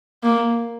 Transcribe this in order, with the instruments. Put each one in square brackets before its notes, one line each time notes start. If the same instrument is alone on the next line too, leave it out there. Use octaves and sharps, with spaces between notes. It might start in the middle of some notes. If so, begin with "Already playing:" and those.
[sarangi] A#3